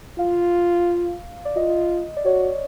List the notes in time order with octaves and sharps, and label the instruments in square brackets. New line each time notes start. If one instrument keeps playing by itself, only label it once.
[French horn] F4 [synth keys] F5
[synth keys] D5
[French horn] F4 [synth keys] D#5
[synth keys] D5
[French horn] F#4 [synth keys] C#5